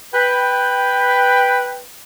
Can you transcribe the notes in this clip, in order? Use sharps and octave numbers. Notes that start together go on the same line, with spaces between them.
B4 G5